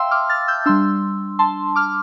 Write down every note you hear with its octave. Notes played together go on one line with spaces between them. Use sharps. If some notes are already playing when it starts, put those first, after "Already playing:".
Already playing: E5 F5 G5 A5 C6 E6
D6 F6
F6 A6
E6 G6
G3 D4 C6 E6
A5 C6
D6 F6